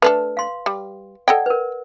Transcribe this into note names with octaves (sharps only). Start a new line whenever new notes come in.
A3 D4 A4 B4
F5 C6
G3
A4 D5 D#5 F#5 G5
A#4 B4